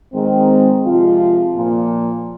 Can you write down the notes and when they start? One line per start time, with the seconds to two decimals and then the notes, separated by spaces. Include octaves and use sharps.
0.13 D#3 G#3 C4
0.84 C3 F3 G#3 F4
1.55 A#2 F3 A#3